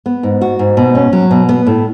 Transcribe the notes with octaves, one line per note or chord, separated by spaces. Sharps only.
B3
G#2
F#4
G#2
B2
C#4
F#3
B2
B3
A2